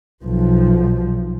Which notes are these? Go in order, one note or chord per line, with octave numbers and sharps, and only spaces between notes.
B1 F3